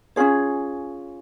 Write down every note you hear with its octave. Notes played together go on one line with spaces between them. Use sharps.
C#4 F4 G#4 C#5